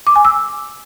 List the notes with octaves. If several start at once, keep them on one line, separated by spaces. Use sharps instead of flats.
D6
G#5
E6